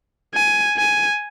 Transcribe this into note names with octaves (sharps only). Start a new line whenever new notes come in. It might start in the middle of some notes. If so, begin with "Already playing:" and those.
G#5
G#5